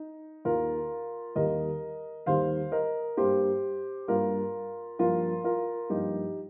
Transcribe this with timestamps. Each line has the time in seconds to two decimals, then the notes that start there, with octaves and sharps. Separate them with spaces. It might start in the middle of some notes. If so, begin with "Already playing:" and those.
Already playing: D#4
0.45 D#2 D#3 A#3 F4 A#4
1.35 D#2 D#3 G3 A#3 A#4 D#5
2.26 D#2 D#3 G3 A#3 C5 F5
2.72 A#4 D#5
3.17 G2 G3 A#3 G4 C5
4.08 G2 G3 A#3 F4 A#4
4.99 G2 F3 A#3 F4 A#4
5.44 F4 A#4
5.90 G2 F3 A#3 D#4 G4